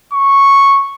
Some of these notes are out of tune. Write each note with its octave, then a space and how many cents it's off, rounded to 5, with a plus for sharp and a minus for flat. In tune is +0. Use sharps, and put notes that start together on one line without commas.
C#6 -5